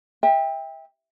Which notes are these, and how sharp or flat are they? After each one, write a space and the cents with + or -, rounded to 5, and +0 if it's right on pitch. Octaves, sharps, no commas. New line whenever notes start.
E5 -25 G5 +25